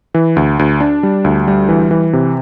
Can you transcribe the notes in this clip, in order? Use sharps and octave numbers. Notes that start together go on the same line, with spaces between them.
E3
D2
D2
D4
G3
D2
G3
E3
E3
C3